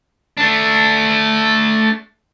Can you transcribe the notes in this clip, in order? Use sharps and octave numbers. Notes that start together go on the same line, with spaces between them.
A3 D4